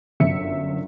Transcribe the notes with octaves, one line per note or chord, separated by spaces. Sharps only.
G1 F#2 E5 C#7